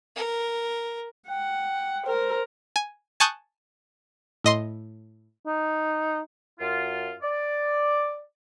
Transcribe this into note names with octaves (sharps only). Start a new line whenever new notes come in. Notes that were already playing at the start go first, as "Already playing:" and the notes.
A#4
F#5 G5
A#4 C5
G#5
G#5 A5 C#6 D#6 F#6 G6
A2 D#5 C6
D#4
F#2 F4
D5